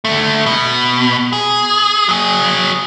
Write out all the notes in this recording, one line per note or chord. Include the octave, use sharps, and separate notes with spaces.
D2 A3
B2
G#4
F#3 G#4